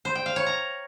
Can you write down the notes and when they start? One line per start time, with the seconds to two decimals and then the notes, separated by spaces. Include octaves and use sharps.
0.05 C5
0.15 G5
0.26 F5
0.36 C#5
0.46 A#5